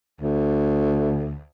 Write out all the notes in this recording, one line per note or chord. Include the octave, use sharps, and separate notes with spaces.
D2